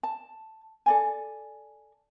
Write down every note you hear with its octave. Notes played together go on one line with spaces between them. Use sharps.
A5
A4 D5 G#5